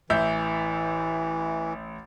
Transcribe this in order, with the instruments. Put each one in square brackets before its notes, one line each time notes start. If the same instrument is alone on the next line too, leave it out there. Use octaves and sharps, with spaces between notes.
[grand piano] A1 E5 G6 [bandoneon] E3